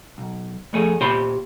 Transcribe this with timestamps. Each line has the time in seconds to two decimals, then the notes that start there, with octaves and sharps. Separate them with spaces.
0.18 B1
0.73 F2 A3 G#4
1.01 A#2 G4 C5 B5 C6